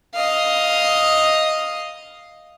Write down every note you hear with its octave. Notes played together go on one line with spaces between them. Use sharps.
D#5 F5